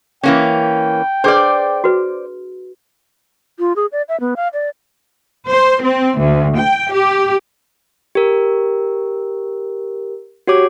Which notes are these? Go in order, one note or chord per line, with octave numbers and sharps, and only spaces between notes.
E3 A#3 C#4 G5
D4 G#4 B4 C5 D5
F#4 B4
F4
G#4
D5
E5
B3
F5
D5
C5
C4
D2
G5
G4
G4 A#4
F#4 G4 C#5 D6